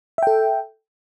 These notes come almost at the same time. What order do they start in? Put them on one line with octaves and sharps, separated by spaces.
E5 G5 A4